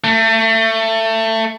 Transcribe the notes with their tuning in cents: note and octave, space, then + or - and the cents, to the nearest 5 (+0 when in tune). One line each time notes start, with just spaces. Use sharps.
A3 +25